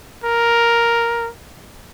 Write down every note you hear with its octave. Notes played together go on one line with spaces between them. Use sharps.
A#4